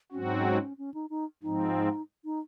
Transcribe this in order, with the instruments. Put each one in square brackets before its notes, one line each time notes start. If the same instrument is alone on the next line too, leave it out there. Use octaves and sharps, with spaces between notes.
[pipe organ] G#2 F#3 C4 F#4 [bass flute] C#4
[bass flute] D#4
C#4
C#4
D#4
D#4
[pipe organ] G#2 F3 C4 [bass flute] D#4
[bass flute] D#4